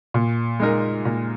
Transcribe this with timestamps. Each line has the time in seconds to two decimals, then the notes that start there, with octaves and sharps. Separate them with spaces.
0.14 A#2
0.60 G#3 D#4 A#4
1.05 A#2